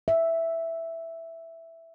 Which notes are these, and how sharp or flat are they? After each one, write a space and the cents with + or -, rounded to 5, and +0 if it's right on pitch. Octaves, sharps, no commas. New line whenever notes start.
E5 +0